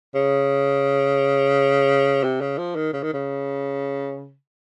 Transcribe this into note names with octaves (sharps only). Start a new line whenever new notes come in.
C#3
C3
C#3
F3
D#3
C#3
D#3
C#3